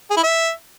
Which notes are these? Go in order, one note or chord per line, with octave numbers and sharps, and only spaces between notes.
G#4
E4
E5